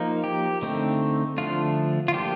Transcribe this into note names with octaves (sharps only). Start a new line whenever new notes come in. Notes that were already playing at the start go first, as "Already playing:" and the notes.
Already playing: F3 A#3 D#4
G4
D3 A3 C4 D#4
D3 F3 A3 D4 F4
F4
F3 A#3 D4 G4